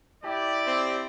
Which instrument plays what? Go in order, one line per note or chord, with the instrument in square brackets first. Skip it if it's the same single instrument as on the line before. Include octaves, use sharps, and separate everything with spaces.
[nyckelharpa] E4 [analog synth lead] G4 [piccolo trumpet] D5
[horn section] C4